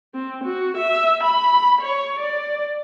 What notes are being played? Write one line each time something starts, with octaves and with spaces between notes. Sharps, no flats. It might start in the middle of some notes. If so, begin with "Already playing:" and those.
C4
F#4
E5
B5
C#5
D5